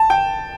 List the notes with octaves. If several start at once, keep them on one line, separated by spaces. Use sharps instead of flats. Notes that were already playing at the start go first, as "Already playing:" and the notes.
Already playing: A5
G5